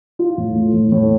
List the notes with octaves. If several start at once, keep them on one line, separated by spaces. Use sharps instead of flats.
F4
A2
A3
A2
A2